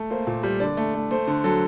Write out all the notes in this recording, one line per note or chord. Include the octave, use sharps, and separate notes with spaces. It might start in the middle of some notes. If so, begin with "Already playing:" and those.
Already playing: A3
A#3 C5
A#2
G3
D3 D5
A3
A3
A3 C5
D3
F#3 A4